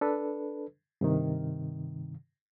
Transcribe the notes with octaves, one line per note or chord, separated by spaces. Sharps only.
D4 A4 B4
G2 C3 D#3